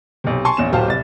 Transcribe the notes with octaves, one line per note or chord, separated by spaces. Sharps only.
B1 C3
G#5 A5 C6 C#6
A#1 E2 C#4 E7
D1 F#3 G4 C5 F5 A5
C2 A6